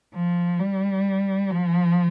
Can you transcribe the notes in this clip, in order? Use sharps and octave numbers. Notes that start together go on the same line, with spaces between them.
F3
G3
F3